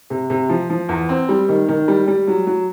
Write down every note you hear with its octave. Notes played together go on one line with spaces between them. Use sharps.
C3
C3
F3
F3
E2
C4
G3
D#3
D#3
G3
G3
F#3
F#3